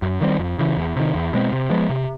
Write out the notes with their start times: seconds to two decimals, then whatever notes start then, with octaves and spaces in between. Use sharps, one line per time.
0.02 F#2
0.21 D#3 G3 C4
0.39 F2
0.59 C#3 E3
0.76 E2
0.96 C3 D#3
1.14 E2
1.33 B2 G#3 C4
1.52 C3
1.70 F3 G#3 B3
1.89 C3